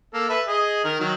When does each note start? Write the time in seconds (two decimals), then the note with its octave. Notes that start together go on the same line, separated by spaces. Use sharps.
0.14 A#3 A4
0.29 A4 B4 E5
0.48 G#4 D#5
0.84 D#3 A#4
1.00 D#3 F#3